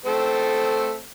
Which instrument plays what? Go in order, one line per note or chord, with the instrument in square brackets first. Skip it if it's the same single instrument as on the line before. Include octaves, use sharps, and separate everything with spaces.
[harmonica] A3 C4 A4